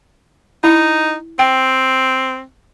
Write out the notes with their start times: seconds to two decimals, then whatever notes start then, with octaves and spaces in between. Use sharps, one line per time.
0.64 D#4 E4
1.39 C4 G5